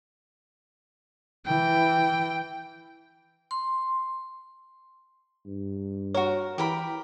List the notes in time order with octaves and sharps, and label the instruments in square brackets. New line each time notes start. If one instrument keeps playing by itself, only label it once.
[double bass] E3 [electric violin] G5
[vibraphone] C6
[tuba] G2
[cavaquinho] F#4 A#4 [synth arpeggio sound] C#5
[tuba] E3 [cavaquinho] G4 A#4 B5